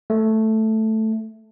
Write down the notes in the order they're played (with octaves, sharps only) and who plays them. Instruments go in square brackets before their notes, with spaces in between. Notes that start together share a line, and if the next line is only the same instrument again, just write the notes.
[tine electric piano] A3